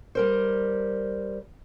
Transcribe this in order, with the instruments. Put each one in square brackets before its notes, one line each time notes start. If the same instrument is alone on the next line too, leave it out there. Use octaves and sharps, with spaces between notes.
[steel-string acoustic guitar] G3 A#4 C5